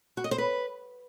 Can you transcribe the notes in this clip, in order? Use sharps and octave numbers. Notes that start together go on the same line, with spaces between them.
F#4
D#5
C5
B4